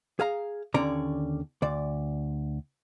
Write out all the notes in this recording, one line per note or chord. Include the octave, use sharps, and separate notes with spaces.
G#4 F5 A#5
D#2 D3 C#4 C#5 D5 A#5
D2 D5